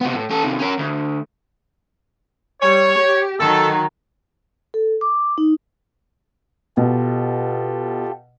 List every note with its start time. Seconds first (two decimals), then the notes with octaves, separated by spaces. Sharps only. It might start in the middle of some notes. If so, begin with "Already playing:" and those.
0.01 C3 B3
0.15 A2
0.30 C#4 A4
0.44 C3 D#3
0.59 C#4 A#4
0.78 D2
2.61 G3 C#5
2.97 G4
3.39 D#3 F#3 D#4 A4
4.74 A4
5.01 D6
5.38 D#4
6.77 B2 F4 G4 A4